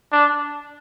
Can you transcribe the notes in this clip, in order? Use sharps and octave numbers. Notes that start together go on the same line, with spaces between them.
D4